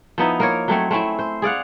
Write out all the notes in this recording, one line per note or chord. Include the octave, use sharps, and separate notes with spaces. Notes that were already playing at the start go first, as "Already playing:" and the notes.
F3 B3 D#4 E4
A#3 A#4 C#5
F#3 A3 C4 C#5
A3 C4 C#4 E4
C5
G#4 D5 F5 F#5